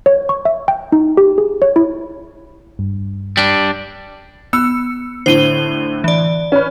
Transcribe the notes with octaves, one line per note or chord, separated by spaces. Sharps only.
C#5
C#6
E5
G5
D#4
G4
G#4
C#5
E4
G2
G3 D4
B3 E6 C#7
A2 D3 C5 D#7 G7
E3 D5
C#4 B4